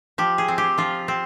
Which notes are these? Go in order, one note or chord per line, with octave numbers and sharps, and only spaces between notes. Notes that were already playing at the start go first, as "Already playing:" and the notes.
F3 G4
G#4
C4
G4
F3 F4
C4